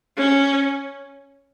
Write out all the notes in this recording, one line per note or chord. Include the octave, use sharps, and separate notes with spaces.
C#4